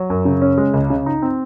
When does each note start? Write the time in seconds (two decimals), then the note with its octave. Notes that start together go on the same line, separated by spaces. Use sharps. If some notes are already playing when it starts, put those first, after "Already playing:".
Already playing: F#3
0.10 F#2
0.25 C#3
0.42 C#4
0.58 G#3
0.73 C#2
0.90 C#3
1.06 D#4
1.22 C4